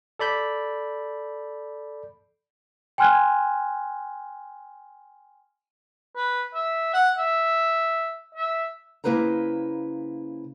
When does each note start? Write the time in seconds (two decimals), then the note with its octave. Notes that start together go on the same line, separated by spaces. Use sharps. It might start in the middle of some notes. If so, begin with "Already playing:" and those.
0.19 A4 D5 B5 G6
2.98 G5 G#5 C6 F6 F#6 G#6
6.16 B4
6.54 E5
6.94 F#5
7.18 E5
8.35 E5
9.04 C#3 A#3 E4 B4 C5 A#5